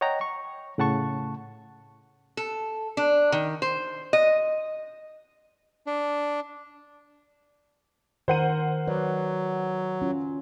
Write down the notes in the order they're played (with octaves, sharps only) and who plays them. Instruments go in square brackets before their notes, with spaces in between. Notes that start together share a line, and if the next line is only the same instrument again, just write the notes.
[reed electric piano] C#5 D#5 F#5 G5 A#5
C#6
A2 C#3 F#5 A5 C#6
[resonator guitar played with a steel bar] A4
D4
D#3
C5
D#5
[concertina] D4
[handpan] D#3 A#4 [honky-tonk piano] C5 F#5 D#7
[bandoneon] F#3 [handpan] B4 D5
[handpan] C#4 F4